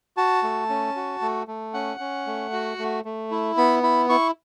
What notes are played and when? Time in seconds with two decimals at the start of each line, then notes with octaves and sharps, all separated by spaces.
0.17 F#4 A5
0.43 A3
0.69 C#4
0.96 F#4
1.21 A3
1.48 A3
1.74 C#4 F#5
2.00 C#4
2.27 A3
2.53 F#4
2.79 A3
3.05 A3
3.31 E4
3.57 B3 B5
3.83 E4 B5
4.09 E4 C#6